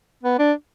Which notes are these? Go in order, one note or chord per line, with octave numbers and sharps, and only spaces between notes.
B3
D4